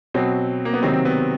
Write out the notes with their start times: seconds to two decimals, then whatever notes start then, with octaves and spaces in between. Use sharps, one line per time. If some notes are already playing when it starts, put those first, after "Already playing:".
0.14 B2 F#3 C4
0.65 A#3
0.74 B3
0.82 C3 D#3 F#3 C4
0.93 C4
1.05 B3